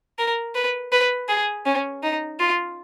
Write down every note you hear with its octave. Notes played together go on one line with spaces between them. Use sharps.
A#4
B4
B4
G#4
C#4
D#4
F4